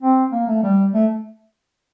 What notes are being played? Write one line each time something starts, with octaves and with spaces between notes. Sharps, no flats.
C4
A#3
A3
G3
A3